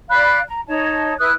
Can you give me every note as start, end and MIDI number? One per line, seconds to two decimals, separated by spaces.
0.09 0.39 74
0.09 0.39 77
0.09 0.39 83
0.09 0.39 90
0.47 0.60 82
0.68 1.12 63
0.68 1.12 73
0.68 1.12 75
0.68 1.12 81
1.18 1.31 64
1.18 1.31 71
1.18 1.31 87
1.18 1.31 90